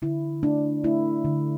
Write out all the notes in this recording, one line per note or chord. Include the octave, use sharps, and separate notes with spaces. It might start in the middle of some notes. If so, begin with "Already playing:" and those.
D3 E4
A3 D4
A3 E4
D3